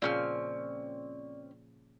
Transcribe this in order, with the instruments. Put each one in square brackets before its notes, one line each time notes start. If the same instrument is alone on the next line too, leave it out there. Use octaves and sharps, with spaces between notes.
[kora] A#2 C#3 F3 [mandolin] C4 C#4 F6 [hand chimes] D5